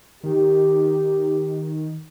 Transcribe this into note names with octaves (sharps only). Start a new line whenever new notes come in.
D#3 G4